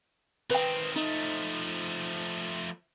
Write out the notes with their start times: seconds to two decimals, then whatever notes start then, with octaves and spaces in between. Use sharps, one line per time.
0.50 D#3 C4 B4 G5
0.96 F3 A3 D#4